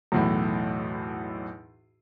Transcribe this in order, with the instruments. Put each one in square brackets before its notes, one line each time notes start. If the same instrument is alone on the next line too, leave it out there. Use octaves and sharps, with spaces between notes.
[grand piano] B1 E2 A2